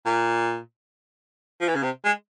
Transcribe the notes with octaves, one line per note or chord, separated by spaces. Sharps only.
A#2
F3
E3
C#3
C3
G#3